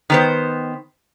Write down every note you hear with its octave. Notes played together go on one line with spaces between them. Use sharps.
D#3 B3 C5